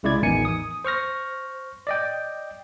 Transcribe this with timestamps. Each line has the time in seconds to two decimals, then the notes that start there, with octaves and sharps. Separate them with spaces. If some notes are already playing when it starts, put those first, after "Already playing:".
0.03 C2 C#3 G#3 E4 D5 G#6
0.22 A1 E2 D#3 D#4 G#5 C#7
0.45 D#6
0.85 C5 C#6 F6 A#6
1.87 D5 D#5 G5